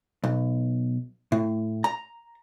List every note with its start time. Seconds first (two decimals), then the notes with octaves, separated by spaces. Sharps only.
0.24 B1
1.32 A2
1.84 A#5